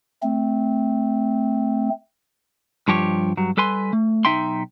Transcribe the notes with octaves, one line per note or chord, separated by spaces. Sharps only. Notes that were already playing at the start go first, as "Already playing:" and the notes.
A3 C4
G2 F3 G4 C#5
G2 F#3
G3 A4 B4 G#5 C6
A3
B1 D#4 E5 G5 C6